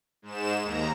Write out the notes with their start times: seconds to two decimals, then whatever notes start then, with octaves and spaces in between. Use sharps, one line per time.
0.22 G#2 E7
0.62 D#2 A#5